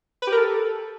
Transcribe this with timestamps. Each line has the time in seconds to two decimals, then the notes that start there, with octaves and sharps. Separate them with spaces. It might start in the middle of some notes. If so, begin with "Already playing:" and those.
0.22 B4
0.27 G4
0.32 A#4
0.37 A4